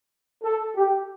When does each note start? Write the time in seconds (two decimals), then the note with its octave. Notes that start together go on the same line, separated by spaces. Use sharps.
0.43 A4
0.75 G4